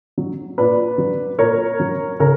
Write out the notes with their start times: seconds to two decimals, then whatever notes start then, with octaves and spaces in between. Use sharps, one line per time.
0.18 F#3
0.58 A#2 B4 D5
0.98 F#3
1.39 A#2 A#4 C#5
1.80 F#3
2.20 C#3 A#4 C#5